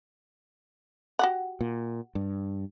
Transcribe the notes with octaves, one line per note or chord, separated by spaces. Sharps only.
F#4 G4 F#5
A#2
G2